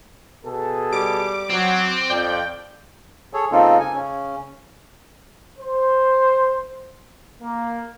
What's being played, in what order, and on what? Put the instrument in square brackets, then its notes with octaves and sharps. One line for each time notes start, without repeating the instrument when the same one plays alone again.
[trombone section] B2 G#4 A4
[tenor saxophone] G3 [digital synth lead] D6
[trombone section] F#3 [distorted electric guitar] C4
[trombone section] F2 [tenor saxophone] D5 [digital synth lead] G5
[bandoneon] G#4 A4 C#5
C#3 A#3 C4 D#4 F4 A4
G#5
C#3 C#4
[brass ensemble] C5
A#3